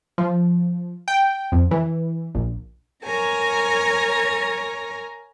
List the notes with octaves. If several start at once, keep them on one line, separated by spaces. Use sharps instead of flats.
F3
G5
F2
E3
A#1
A#4 C#5 G#5 A#5